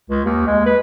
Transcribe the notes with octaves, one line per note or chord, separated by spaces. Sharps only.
C#2
D#2
G#3
B4